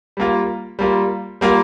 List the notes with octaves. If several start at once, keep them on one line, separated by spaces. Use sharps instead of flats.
G3 A#3 F4
G3 A#3 F4
G3 A#3 F4